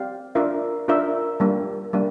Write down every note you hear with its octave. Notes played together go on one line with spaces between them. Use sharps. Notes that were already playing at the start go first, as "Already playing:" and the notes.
Already playing: C4 G4 D5 F5
D4 F4 A#4 E5
D4 F4 A#4 E5
G3 A#3 D4
G3 A#3 D4